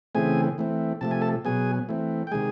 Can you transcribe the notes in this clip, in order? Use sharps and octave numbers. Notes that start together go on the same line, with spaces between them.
C#3 E3 A3 C4 G#4 G#5
E3 A3 C4
C3 F3 A3 A5
G#5
A4 A5
B2 F#3 B3 G#4 G#5
E3 A3 C4
G5
C3 D#3 G#3 G#4 G#5